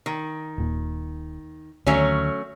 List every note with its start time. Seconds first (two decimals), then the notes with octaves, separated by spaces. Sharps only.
0.06 D#3
0.58 D#1 A#2
1.87 D2 D#3 F#3 A3 C#4